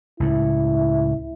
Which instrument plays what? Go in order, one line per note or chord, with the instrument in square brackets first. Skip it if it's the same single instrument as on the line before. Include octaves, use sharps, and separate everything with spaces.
[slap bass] C#2 A2 [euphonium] E4